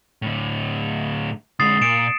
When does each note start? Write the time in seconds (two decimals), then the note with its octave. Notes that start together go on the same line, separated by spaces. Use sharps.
0.22 A2 D3
1.60 D3 G#3 D#6 A6 C7
1.81 A#2 C#7 D7 E7